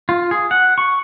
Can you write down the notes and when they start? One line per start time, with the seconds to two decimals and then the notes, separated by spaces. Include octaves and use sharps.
0.09 F4
0.31 G#4
0.51 F#5
0.78 C#6